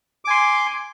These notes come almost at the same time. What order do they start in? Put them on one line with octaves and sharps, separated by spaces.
D6 G#5 C6